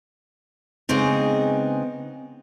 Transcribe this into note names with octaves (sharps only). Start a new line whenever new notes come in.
C#3 G#3 B3 C4 D#4